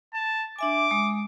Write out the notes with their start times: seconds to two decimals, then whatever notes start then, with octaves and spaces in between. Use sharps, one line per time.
0.14 A5
0.59 D4 E5 G#5 D6
0.91 G#3 D#6